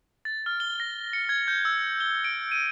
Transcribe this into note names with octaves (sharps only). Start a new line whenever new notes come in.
A6
F6
G7
A#6
C#7
G#6
G6
E6
G7
D7
D#7